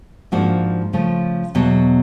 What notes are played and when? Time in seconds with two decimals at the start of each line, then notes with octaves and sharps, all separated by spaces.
0.32 G#2 F3 A#3 D4 F#4
0.93 C#3 F3 A3
1.55 E2 B2 F#3 B3